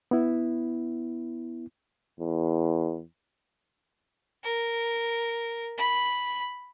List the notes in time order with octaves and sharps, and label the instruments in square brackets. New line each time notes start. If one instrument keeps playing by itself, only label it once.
[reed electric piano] B3 E4
[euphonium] E2
[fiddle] A#4
B5